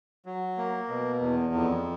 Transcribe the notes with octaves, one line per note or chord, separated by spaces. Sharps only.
F#3
A#3
B2
E2
F2